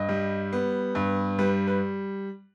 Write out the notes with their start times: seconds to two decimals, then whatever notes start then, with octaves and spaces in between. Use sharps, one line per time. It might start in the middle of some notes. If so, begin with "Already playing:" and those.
Already playing: G2 D#5
0.09 G3
0.53 B3
0.95 G2
1.38 G3 B4
1.67 B4